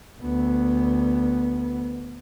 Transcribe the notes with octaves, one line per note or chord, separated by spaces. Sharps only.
D2 B3